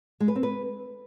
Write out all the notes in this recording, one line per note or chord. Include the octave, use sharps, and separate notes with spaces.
G#3
B4
C4
B4